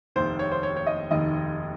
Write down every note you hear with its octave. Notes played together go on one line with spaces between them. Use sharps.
F1 D#2 D#3 C5
C#5
C5
C#5
C#5
D#5
F1 D#2 D#3 D#5